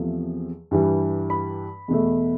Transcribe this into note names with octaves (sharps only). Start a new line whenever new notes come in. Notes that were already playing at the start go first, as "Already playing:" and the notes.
Already playing: E2 C3 F3 A3
G2 E3 G3
B5
E2 B2 A3